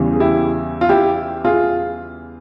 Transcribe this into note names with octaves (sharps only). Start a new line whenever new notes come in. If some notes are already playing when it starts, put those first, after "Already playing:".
Already playing: E2 C#3 E3 G3
G#4
E4 G4
F4
E4 G4
F4 G#4